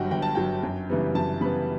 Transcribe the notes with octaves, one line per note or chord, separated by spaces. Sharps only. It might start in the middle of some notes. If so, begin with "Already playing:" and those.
Already playing: G1 G2 F#3 F#5 G5
G1 G5
A5
G2 F#3 G5
F#2
C#3 E3 G3 B3
F#2 A5
C#3 E3 G3 B3 B5